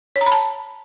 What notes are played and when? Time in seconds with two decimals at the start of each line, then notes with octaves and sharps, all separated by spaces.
0.16 C#5
0.21 A#5
0.26 B5
0.32 A5